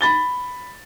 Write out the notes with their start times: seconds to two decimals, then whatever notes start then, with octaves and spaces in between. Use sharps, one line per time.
0.01 B5 A6 G7